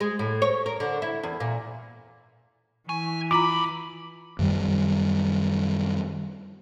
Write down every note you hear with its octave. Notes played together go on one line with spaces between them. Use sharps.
G#3
A2
C#5
A#4
D3
E4
E2
A#2
E3 G#5 C#6
D#2 F4 A#5 B5 D6
F#2 D#3 G3